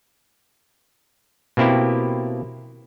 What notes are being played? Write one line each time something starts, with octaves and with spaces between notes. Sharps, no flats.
B2 A#3 C4 E4 G4